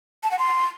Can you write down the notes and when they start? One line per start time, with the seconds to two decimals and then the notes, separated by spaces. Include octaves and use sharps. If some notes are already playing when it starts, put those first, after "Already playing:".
0.23 A5
0.31 F#5
0.39 C6